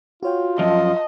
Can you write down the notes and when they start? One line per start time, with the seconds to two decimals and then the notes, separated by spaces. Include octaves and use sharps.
0.23 F4 F#4 C#5 G5
0.59 F#2 F3 D#5 A5